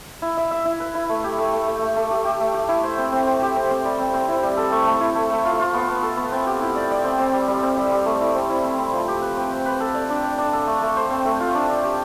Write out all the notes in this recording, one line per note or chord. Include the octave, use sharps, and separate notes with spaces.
E4
E5
E5
E4
B4
E4
A3
G4
A3
A3
A3
A3
A3
G4
G4
A3
G4
E4
C5
C4
C4
C5
G4
C4
C4
G3
C4
C4
E4
G3
A4
A3
A3
E4
A3
A3
F4
F4
B3
B3
A4
B3
C4
G4
E4
D5
D5
C4
C4
G3
G3
C4
G3
G3
A3
E4
C4
E4
C4
C4
F3
G4
B4
C4
C4
B4
A4
D5
D4
D5
D4
A4
A3
A3
C5
C4
A3
F4
D4
D4
G4